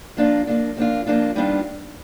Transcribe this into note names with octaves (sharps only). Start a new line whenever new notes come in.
F3 A#3 D4 F4
F3 A#3 D4 F4
F3 A#3 D4 F4
F3 A#3 D4 F4
D#3 G3 B3 D4 F4